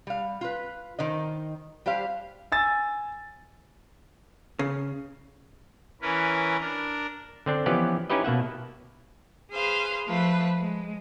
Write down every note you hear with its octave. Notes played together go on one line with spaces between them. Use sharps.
G3 F5
F4 B4
D#3 C5 D#5
G3 G4 C5 F5
G#5 E6 A6
C#3
E3 C#4 A#4 B4
D4 A#4
D3 C4 D4
E3 F3 B3 C#4 G4 D5
C#4 D#4 E4 G4 B4 D#5
B2 A#3 E5 F#5
G#4 B4 C5 F5
F3 A3 B4
G#3